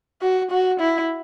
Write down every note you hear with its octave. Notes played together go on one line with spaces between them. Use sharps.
F#4
F#4
E4